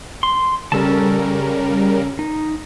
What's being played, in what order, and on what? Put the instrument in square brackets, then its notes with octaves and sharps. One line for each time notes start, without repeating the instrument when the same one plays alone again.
[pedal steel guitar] C6
[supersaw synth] C#3 G3 A#4 [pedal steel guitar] C#4 A4 A5
[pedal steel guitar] D#4